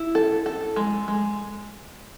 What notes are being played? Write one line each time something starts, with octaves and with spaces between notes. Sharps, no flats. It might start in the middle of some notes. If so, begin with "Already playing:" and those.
Already playing: E4
A4
A4
G#3
G#3